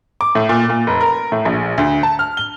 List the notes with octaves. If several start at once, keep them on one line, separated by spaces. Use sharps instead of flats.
D6
A2
A#2
A#2
F1
A#4
A2
A#1
D2
A5
F6
G7